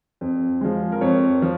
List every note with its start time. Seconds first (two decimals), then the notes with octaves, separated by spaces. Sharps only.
0.21 F2
0.61 F3 G#3
0.92 A#4
1.01 F2 C#5
1.42 F3